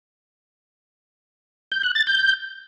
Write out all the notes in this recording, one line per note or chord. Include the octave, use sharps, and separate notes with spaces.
G6
F#6
A6
G6